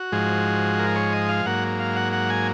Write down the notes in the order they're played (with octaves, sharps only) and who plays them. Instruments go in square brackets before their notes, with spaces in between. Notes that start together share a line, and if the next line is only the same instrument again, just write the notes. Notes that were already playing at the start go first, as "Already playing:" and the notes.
Already playing: [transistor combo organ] F#4
G#2 F3 G#3
A#4
C#5
D#5
F5
G#2 F#3 A#3 F#5
F5
F#5
F#5
G#5